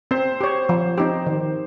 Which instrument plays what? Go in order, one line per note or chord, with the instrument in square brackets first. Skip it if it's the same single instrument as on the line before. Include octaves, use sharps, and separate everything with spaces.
[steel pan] C4 [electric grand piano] C5
[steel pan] G4 C#5
F3
C4 D#4 G4
D#3